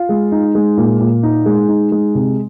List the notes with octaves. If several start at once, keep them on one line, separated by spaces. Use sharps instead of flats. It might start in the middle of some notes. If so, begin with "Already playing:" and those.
Already playing: F4
G#3
D#4
G#3
A#2
A#2
D#4
G#3
D#4
G#3
C3